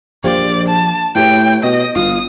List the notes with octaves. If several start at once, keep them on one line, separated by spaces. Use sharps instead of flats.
A#1 F3 G4 C5 D5
A5
A2 G4 B4 C#5 G5
B2 D#5
G1 F4 D#6